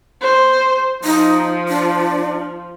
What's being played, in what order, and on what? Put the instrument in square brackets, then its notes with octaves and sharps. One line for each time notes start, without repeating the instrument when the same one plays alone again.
[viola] C5
[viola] F3 [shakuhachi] D#4
[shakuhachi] D4